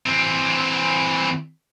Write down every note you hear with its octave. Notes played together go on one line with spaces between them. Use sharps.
E3 C4